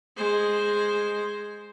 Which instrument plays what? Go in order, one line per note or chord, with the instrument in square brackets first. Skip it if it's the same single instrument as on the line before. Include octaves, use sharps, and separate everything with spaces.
[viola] G#3 C5